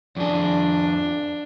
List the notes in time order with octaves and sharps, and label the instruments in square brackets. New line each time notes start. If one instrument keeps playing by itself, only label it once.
[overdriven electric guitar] F2 G#4 [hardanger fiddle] D4